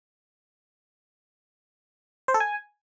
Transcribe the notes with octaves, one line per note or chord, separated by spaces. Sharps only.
C5
A4
G#5